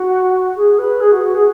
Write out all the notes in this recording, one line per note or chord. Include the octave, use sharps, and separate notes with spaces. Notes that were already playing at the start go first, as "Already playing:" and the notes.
Already playing: F#4
G#4
B4
G#4
F#4
F#4
G#4